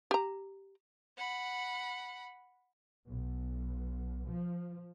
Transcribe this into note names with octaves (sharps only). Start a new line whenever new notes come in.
G4 A#5
F#5 B5
B1
F3